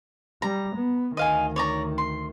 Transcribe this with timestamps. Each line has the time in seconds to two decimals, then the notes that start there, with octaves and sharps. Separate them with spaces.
0.42 G3 A#5
0.76 B3
1.17 D2 D#3 D#5 F5 G#5
1.56 C#5 D5 A#5
1.98 C6